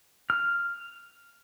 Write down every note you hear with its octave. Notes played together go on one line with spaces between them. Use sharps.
F6